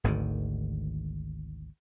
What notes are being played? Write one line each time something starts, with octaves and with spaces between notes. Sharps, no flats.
G#1 D2 G#2 D#3